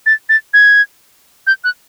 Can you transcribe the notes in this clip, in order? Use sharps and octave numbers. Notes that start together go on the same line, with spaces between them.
A6
A6
G#6
G6
F#6